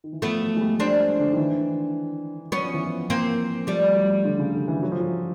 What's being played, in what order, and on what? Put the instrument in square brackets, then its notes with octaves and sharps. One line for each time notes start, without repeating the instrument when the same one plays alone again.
[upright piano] D#3
E3
[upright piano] F3 [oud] A3 B3
[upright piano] F#3
G#3
G3
[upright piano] G3 [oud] C4 D4
[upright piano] D3
D#3
E3
[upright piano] F#3 [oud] B3 C#4
[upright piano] F3
E3
F3
[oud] A#3 C4
[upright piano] F3 [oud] G3 A3
[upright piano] F#3
D3
C#3
D3
E3
F#3
F3
F#3